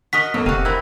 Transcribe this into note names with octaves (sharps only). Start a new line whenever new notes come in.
F#4 A#4 D#5 B6
A1 F#3 A#3 B3 A4
F1 C3 F#4 G4 F5 D#7
C4 E4 A#4 F#6